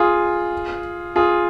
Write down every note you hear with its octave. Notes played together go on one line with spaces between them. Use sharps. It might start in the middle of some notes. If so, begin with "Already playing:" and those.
Already playing: F4 G#4
F4 G#4